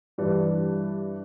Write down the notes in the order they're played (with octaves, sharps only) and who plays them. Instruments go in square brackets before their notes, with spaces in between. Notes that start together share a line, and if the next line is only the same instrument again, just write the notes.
[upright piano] G2 E3 G3 D4